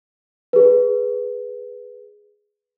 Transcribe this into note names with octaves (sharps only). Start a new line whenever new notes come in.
G#4 B4